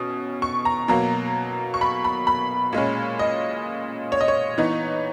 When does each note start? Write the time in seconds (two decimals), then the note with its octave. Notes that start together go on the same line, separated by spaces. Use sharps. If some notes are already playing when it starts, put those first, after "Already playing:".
Already playing: B2 C#4 D#6
0.42 C#6
0.65 A#5
0.88 B2 F#3 A#3 A#5
1.74 C#6
1.81 B5
2.04 B5
2.27 B5
2.73 A#2 G#3 C#4
3.19 D#5
4.12 C#5
4.21 D#5
4.28 C#5
4.58 E3 B3 D#4